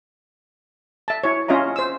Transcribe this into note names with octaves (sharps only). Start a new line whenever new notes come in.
E5 A5
E4 C#5
C#4 F4 D#5 E5 A#5
C5 E6